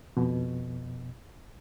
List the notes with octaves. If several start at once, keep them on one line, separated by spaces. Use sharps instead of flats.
F2 B2